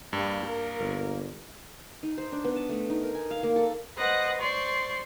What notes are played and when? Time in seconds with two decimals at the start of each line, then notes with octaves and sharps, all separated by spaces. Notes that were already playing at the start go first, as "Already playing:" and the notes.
0.13 G2 G3 A#3
0.47 A#4
0.79 G1
2.03 D#4
2.18 C5
2.32 D4
2.44 B3
2.56 A5
2.69 A3
2.90 D#4
3.03 A#4
3.15 G#5
3.31 F5
3.43 A#3
3.56 A4
3.97 B4 C5 D#5 F#5 F#6
4.39 C5 D5 C6 C#6